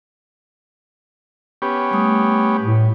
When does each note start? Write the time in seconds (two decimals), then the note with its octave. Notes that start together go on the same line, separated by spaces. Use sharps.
1.62 B3 C#4 G4
1.91 G3 A3 D#6
2.60 A2